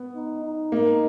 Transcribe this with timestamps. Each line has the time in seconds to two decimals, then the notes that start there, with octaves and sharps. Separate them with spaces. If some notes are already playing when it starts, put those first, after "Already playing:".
Already playing: B3
0.16 D#4
0.44 D#4
0.72 A#3